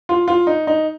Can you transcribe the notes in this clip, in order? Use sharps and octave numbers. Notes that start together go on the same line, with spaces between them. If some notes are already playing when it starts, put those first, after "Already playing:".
F4
F4
D#4
D#4